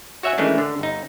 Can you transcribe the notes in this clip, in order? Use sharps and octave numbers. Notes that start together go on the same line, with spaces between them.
F#4 C#5 E5 F#5 G#5
D#3 E3 G#3 A3 C#4 D4
D3
G1 D#4